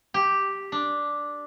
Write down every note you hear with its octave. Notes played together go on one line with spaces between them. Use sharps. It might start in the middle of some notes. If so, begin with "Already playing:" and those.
G4
D4